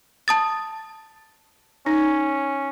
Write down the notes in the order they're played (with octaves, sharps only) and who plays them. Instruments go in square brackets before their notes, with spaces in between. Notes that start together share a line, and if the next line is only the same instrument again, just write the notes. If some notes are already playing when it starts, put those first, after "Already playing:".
[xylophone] A5 D#6 A6
[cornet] C#4 [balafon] D#4